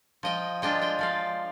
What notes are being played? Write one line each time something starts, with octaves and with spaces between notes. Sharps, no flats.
F3 D#5 G5
G#3 D4 F4 D#5 G5
D#5 G5
F3 D5 F5